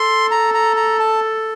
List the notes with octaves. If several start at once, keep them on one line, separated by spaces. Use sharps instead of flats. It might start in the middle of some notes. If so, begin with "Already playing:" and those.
Already playing: A4 C6
A#5
A#5
A#5
A5